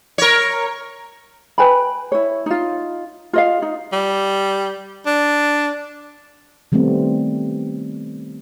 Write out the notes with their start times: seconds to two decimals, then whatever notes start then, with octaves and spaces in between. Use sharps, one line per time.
0.18 A#4 C#5
1.58 B4 G5 G#5 B5
2.12 E4 C#5
2.46 D#4 F4
3.33 F4 D#5 F5
3.62 D#4
3.93 G3
5.07 D4
6.72 D#3 G3 A3 B3 C4